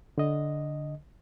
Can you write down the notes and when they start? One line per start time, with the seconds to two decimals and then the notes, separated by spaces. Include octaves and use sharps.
0.18 D3 D#5